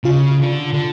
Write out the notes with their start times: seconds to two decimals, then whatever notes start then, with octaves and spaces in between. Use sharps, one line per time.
0.04 C#3 F4
0.39 D3
0.74 D3